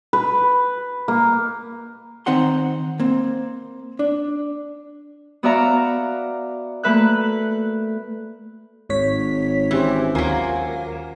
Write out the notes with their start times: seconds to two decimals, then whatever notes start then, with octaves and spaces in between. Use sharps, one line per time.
0.13 B4
1.08 A#3
2.26 D#3 C4 D#4 F#5 C6
2.99 A#3 C4
3.99 D4
5.43 B3 F#4 D5 E5 F5 A#5
6.83 A3 A#3 B4 E5 F#6
8.90 G#1 G#2 C#5 B6
9.71 E3 C#4 G4 C5
10.15 D#2 F#3 A#3 F4 G#5